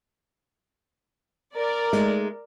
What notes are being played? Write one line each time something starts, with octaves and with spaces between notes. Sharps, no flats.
A#4 D5
G#3 A3 D#4